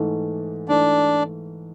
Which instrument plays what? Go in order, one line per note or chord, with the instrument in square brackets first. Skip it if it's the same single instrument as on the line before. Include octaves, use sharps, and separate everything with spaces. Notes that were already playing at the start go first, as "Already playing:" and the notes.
Already playing: [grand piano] G#2 E3 A3
[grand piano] G#2 E3 A3 [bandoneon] D4